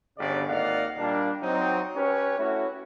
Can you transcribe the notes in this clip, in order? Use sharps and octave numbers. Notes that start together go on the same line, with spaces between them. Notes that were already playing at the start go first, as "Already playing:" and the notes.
G1 C#3 D5
G#1 A#3 D5 D#5 F5 F#5
A#2 G3 A#3 D4
F#3 C4 D#4
C#4 G4 B4 C#5
A3 C#4 E4 F#4